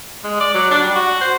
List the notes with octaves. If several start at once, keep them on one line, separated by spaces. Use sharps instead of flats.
G#3
D5
F#3
D4
G3
F#4
C5